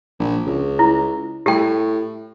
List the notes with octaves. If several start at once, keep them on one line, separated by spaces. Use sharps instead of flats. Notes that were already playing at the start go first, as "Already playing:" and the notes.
A#1
C#2
E4
A2 G4 G5